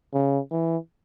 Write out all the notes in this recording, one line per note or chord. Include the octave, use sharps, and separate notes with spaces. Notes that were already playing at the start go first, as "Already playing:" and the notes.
C#3
E3